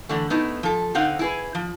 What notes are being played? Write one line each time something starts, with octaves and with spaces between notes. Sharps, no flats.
D3 E3 A3
A3 B3 D#4 E4
F3 A4
D3 C4 D#4 F5 F#5
E4 G#4 B4
F3